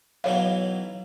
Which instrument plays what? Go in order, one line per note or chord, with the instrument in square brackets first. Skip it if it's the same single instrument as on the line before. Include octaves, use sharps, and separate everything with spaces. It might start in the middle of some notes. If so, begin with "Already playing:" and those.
[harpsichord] B1 E3 F#3 [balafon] C#5 F5